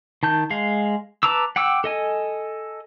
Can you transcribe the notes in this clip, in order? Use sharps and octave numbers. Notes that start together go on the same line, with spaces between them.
D#3 A5 G6
G#3 F5
B4 A5 A#5 D6 E6
F#5 G5 D6 E6
A4 D#5 G#5